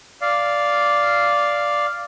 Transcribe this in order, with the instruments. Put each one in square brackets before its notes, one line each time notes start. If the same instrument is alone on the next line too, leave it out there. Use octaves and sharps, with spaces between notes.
[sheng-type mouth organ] D5 F5